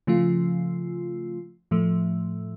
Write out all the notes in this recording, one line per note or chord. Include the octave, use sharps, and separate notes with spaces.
C#3 F3 A3 F4
A2 F3 A3